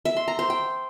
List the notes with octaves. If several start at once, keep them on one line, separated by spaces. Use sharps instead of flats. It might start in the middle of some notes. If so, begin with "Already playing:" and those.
E5
C6
A#5
C5
G5